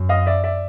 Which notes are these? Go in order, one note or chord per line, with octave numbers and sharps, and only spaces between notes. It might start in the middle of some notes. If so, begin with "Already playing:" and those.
Already playing: F#2
D#5 F5
D5 E5
D5 E5